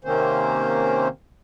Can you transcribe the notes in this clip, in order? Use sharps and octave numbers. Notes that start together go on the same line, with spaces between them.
C3 D#3 A#3 C4 C#4 C5